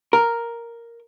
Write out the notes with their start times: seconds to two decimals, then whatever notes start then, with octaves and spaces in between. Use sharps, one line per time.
0.13 A#4